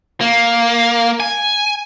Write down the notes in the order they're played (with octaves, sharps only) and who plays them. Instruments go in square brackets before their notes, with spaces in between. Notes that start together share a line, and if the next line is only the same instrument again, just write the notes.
[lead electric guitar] A#3
G#5